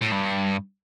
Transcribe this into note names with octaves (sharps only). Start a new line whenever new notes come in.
A2
G2